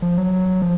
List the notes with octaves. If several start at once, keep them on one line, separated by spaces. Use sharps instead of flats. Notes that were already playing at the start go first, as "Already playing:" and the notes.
F3
F#3
F3